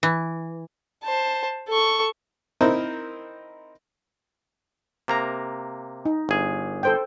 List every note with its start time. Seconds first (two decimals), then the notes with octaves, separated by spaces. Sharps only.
0.03 E3
1.04 C5 A5
1.68 A4 C#6
2.61 C4 D#4 E4 A#4 C5
5.08 C3 A#3 A#5
6.05 D#4
6.29 G1 G#4
6.83 A4 C5 G5